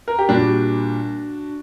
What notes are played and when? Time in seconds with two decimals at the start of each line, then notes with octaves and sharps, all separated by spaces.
0.08 A#4
0.19 G4
0.29 A#2 G3 D4 F#4